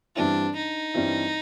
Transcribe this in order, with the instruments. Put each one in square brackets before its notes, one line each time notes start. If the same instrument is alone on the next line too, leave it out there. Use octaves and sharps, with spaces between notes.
[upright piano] G2 E3 G3 C4 E4 [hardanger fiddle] D4
[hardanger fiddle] D#4
[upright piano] G2 E3 G3 C4 E4